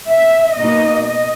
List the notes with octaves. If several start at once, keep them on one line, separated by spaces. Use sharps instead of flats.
E5
B2 A#3 D#4 D#5
D#5